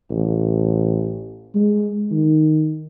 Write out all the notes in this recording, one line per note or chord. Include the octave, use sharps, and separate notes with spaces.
A1
G#3
D#3